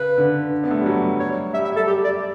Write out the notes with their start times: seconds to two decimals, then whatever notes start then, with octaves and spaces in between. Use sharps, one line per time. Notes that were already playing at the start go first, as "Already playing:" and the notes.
Already playing: C#3 B4
0.18 D3
0.64 B3
0.71 A3
0.78 G3
0.86 F#3
1.20 C#5
1.53 G3 E5
1.64 E5
1.76 A4
1.87 G4
2.04 D5